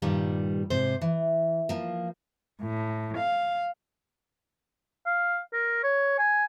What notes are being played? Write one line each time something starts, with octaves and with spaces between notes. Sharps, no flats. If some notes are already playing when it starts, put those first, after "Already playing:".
G2 A#2 D#3 G3
G#2 C3 C5
E3
F3 A#3
A2
F5
F5
A#4
C#5
G#5